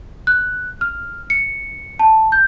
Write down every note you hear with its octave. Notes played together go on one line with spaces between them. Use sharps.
F#6
F6
C#7
A5
G6